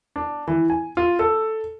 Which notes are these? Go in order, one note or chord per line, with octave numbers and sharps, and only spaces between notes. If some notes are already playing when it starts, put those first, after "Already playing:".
D4
E3
G#5
F4
A4